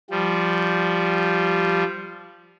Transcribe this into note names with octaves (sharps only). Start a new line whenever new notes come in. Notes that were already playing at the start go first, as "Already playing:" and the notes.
F3 G3